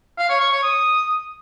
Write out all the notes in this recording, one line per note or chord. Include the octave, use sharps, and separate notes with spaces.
F5
C#5
C#6
C#5
D#6